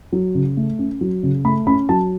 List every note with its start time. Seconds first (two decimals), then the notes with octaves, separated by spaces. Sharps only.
0.12 F#3
0.35 C#3
0.57 A3
0.79 C#4
1.01 F#3
1.23 C#3
1.45 A3 B5
1.67 C#4 B5
1.89 F#3 A5